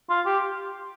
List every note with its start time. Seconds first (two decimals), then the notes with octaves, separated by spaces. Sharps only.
0.09 F4
0.26 G4